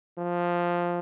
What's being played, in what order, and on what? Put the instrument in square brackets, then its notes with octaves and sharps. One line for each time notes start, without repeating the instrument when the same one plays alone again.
[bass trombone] F3